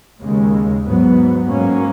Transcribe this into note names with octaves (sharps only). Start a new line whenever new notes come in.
D#2 C#3 G#3
G#2 F#3 B3
G#2 F#3 A#3 C#4